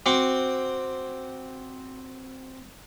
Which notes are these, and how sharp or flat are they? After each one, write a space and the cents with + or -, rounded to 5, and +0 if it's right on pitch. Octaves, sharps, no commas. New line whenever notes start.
C4 +0 F#4 +0 D6 +0